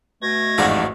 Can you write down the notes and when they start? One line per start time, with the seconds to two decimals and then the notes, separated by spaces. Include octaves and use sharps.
0.22 B2 A3 G#6 A#6
0.58 A1 F2 G#2 F#4 D5 F5